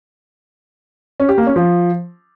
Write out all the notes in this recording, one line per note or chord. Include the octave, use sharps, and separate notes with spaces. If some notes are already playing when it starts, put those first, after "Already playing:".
C#4
G4
A#3
C#4
F3